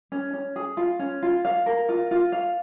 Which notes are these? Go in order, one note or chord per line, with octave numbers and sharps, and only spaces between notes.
C#4
C#4
G#4
F4
C#4
F4
F5
A#4
F4
F4
F5